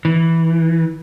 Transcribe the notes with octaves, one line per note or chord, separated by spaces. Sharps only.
E3